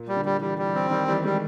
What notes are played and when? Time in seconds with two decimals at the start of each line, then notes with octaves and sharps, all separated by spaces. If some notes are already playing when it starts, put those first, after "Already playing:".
Already playing: A#2
0.08 G3
0.16 D3
0.25 G3
0.41 E3 G3
0.58 G3
0.66 E3
0.75 C4
0.91 D#3 G3
1.08 E3 G3
1.24 G3 G#3